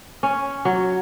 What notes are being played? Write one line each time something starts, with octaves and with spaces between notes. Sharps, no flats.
C#4
F#3